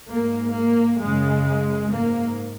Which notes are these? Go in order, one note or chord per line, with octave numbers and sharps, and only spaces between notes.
G#2 A#3
A#3
F#2 C#3 G#3
G#2 A#3